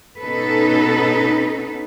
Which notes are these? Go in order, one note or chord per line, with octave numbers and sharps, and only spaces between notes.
B2 B3 C#4 D#4 A4 B4